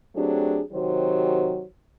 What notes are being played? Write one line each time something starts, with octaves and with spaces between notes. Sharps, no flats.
F#3 A3 C4 D4 G4 G#4
C3 D#3 F#3 F#4 G4 C5